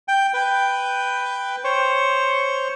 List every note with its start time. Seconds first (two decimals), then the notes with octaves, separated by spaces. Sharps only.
0.08 G5
0.34 B4 G5
1.64 C5 C#5